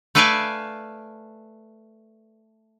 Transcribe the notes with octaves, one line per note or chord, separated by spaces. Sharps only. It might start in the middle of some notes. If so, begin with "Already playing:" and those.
A3 A4 B4 D5 F5 G#5